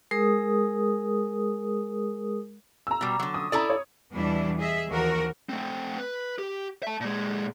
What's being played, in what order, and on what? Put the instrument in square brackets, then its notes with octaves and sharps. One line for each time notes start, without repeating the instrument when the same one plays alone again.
[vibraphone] G#3 G#4 A#4 D#6
[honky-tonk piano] A#5 E6
[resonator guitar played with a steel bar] B2 G3
D3 F#3
[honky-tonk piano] D#6
[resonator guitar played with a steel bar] E4 A4 D5 [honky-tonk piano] A#5 D#6
[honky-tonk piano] C#5
[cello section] E2 B2 E3 G3 D4 E4
G#4 D#5 E5
D#2 E3 F3 F#4 A#4
[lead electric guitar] A3 C4
B4
G4
E5 A5
A#2 G#3